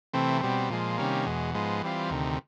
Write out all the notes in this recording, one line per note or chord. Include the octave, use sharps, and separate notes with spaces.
C3 E3 A3 C4
B2 G3 C4
A#2 F3 G#3
C3 D#3 G3 A#3 C#4
E2 B2 G#3
G#2 F3 G#3 B3
E3 G3 C4 F4
D2 C3 D#3